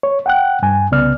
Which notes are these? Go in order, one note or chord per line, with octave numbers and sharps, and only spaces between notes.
C#5
F#5 G5 F#6
G2 G#5
C2 C#3 B3 D5 F6